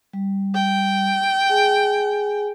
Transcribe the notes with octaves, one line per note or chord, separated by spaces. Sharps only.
G3
G5
G#4 G#5